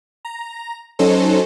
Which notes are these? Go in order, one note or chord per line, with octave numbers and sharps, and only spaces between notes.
A#5
F#3 C#4 D#4 A4 C5